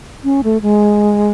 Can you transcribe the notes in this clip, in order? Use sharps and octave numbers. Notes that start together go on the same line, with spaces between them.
C#4
A3
G#3